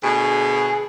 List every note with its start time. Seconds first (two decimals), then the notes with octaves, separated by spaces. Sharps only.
0.04 D2 B2 G#4